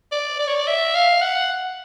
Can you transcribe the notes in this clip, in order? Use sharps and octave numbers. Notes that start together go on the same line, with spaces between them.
D5
D5
C#5
D5
E5
F5
F#5